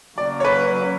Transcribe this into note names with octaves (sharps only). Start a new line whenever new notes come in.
C#3 F#3 A#3 D5
C#5
B4